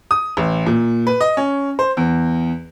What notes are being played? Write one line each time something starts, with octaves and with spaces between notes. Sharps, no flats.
D#6
A1
A#2
B4
D#5
C#4
C5
E2